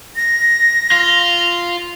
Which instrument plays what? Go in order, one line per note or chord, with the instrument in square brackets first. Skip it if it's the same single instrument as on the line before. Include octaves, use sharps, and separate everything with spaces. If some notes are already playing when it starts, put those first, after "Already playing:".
[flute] A#6
[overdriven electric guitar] F4